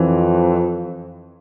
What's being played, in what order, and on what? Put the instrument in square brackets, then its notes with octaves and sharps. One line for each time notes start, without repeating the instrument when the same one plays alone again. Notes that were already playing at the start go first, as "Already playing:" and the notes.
Already playing: [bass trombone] F2 [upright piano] E3